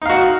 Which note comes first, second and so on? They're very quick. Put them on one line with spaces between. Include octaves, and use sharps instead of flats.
D#4 F5 F#4